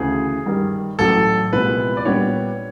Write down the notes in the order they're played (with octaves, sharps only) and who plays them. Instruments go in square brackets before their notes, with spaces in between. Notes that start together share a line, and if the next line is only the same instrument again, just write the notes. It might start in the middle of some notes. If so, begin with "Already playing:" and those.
Already playing: [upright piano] D2 C#3 E3 [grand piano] G#4
[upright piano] G2 D#3 G3
[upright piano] A1 A2 F#3 [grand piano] A4
[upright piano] C2 A#2 F3 G#3 B3 [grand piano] B4
[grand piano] D5
[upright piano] A#2 G3 B3 D4 [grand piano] C#5